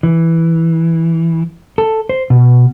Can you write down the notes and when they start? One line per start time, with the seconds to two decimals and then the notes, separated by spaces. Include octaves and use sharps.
0.03 E3
1.78 A4
2.09 C5
2.30 B2